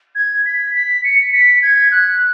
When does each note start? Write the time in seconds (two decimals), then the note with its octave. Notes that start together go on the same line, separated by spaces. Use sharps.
0.15 G#6
0.46 B6
0.75 B6
1.04 C#7
1.33 B6
1.63 G#6
1.91 F#6